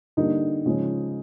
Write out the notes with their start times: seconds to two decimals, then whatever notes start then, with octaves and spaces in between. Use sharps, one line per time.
0.17 D3 G3 A#3 D4 D#4
0.66 C#3 F3 G#3 C#4